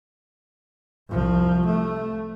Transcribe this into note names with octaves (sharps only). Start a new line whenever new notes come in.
C2 F3
A3